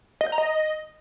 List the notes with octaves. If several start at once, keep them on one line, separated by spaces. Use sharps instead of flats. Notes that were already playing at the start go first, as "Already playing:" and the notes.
D#5
G6
A#5
D#5